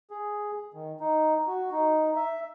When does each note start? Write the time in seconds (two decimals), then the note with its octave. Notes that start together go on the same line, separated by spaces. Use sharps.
0.11 G#4
0.74 D#3
1.00 D#4
1.47 F#4
1.72 D#4
2.16 E5